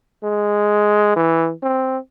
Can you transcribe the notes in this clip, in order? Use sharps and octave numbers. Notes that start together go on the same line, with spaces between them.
G#3
E3
C4